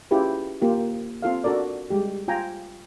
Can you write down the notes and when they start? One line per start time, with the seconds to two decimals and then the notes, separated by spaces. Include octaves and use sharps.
0.11 C#4 E4 F4 G4 G#4 B4
0.62 A#3 F4 G4
1.23 C4 F4 A4 F5
1.44 D4 F#4 A4 A#4 D5
1.90 G3 G#3 G4
2.28 F4 G5 G#5 A#5